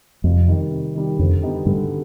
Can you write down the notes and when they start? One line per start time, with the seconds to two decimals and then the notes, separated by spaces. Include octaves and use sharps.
0.24 F2 C3
0.48 D#3 G3
0.71 C3
0.95 D#3 G3
1.19 F2 D3
1.42 G3 B3 D#4 G4
1.65 G2 D3